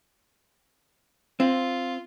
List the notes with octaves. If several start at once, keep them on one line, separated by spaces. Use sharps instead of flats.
C4 F4